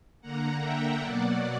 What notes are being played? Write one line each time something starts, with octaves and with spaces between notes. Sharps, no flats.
D3 A#3 F#5 A#5
E5 G5
B2 F#3 A#3 D5 F#5